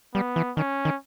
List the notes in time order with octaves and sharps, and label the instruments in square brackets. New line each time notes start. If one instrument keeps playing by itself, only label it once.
[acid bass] G3 [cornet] B3
[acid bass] E3
[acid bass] D#3 [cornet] C#4
[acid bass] D#3